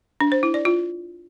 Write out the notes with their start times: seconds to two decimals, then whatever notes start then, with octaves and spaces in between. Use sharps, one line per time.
0.20 D4
0.32 C5
0.43 E4
0.54 D5
0.65 F4